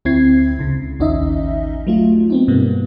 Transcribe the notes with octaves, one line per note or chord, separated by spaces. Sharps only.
D2 C4 E4 G#6 C7
C#2 C#3
A1 D#2 C#4 D#4 D#5 E5
F#3 A3 F4
B3 C4 D#4
G2 B2 G3 A#3 B3